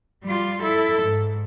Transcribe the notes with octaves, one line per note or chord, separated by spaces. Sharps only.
G3 F4
E4 A4
G#2